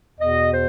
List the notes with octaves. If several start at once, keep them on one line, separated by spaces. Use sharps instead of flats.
E2 B2 D#5
C5